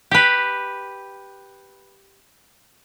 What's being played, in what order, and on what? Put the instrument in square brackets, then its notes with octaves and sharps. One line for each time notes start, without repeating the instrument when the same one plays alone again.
[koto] G4 B4